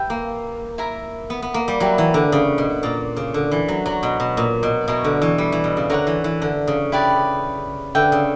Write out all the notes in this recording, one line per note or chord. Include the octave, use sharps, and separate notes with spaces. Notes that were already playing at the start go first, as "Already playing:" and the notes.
Already playing: G4 B4 E5 G5
A#3
E4 A#4 E5 A#5
B3
B3
A#3
G3
F#3 E4 G4 B4 E5
E3
D3
C#3
B2
A#2 D5 A#5 D6
C#3
D3
E3
F#3
F#3 D5 A#5 C#6
B2
B2
A#2
B2
B2 E4 A#4 C#5
D3
E3
G3
E3
B2
C#3
D3 A#4 C#5 F#5 A#5
E3
E3
D3
C#3
E4 G4 B4 D5
D3 B4 E5 G5
C#3